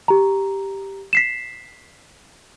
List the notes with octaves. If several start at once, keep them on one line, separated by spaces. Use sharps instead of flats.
G4 A#5
B6 C7 E7